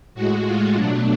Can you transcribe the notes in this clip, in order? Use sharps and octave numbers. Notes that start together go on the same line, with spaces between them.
A2 G#3 F#4
F4
B2 F#3 A3 D4